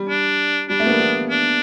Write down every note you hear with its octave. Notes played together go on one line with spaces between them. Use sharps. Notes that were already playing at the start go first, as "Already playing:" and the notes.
Already playing: G3
D4
G3 D4
A3
B3
A#3
B3
D4